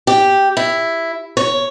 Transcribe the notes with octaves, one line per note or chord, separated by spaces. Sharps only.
G4
E4
C#5